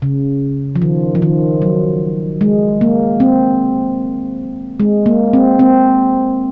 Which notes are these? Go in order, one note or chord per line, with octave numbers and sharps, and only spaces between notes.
C#3
F3
D#3
F3
D#3
F#3
G#3
A#3
C4
G#3
A#3
C4
C4